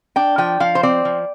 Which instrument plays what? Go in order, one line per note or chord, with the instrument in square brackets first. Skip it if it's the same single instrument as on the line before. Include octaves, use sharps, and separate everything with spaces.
[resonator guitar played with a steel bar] D4 G5
F3 G5
F3 F5
C5
C4 D5
F3